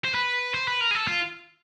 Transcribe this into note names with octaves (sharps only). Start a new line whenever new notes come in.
C5
B4
C5
B4
A#4
G#4
A4
F4